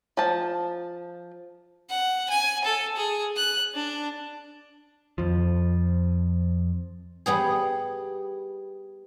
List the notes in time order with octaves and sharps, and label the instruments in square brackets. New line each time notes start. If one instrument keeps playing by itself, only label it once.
[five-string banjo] F3 A5
[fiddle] F#5
G#5
A4
G#4
F#6
D4
[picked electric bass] F2 F3
[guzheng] G3 B3 G#4